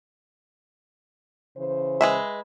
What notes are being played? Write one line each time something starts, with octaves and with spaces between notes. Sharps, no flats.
C#3 E3 C5
G#3 B4 E5